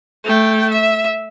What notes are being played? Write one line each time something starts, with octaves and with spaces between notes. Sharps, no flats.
A3 G5
E5